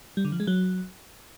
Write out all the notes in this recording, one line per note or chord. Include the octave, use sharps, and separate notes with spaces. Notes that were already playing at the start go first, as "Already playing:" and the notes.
G3
D3
F3
G#3
F#3